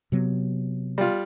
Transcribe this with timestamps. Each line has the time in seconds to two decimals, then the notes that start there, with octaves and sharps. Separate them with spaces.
0.12 C3 F#3 B3
0.98 G3 F4